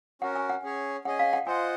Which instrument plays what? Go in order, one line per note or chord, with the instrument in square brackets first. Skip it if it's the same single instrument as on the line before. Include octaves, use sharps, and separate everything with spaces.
[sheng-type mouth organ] C#4 F#4 A#4 [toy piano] F#5
[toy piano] G#5
F#5
[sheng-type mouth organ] C#4 G#4 C#5
[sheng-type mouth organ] C#4 G#4 D#5 G#5 [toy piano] F#5
[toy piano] F5
F#5
[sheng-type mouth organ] F4 C5 D#5 F#5 [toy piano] G#5